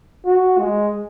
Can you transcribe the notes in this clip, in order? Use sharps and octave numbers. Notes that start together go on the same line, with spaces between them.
F#4
G#3